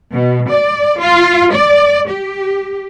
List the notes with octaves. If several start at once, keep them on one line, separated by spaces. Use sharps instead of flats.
B2
D5
F4
D5
G4